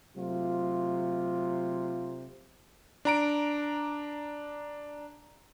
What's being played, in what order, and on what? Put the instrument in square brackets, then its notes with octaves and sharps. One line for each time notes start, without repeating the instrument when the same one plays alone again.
[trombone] C3 [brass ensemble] F#3 A3 F4
[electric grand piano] D4 A#5 D7